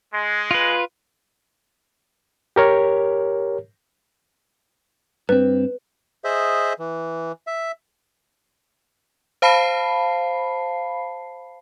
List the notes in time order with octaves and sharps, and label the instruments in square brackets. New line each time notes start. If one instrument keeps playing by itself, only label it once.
[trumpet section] G#3
[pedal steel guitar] F4 B4
[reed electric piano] G4 A#4 C#5
[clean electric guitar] G2 C4 [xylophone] B4
[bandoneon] G#4 C5 D#5 E5
E3
E5
[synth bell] C5 F5 A5 B5 C7